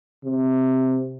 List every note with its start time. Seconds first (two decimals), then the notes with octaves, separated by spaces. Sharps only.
0.24 C3